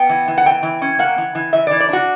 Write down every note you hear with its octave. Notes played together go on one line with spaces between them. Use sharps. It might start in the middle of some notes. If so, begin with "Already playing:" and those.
Already playing: B3 G5
E3
E3
F#5
E3 G5
E3
C#4
A#3 F#5
E3
E3
E3 E5
E3 D5
D5
D4 F#4